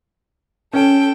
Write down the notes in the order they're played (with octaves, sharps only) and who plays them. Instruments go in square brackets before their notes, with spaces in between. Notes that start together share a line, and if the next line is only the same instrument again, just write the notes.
[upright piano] C#4 [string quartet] A4 G5